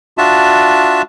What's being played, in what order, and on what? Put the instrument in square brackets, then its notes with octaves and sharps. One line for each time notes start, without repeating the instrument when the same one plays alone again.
[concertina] D4 F4 F#4 E5 A5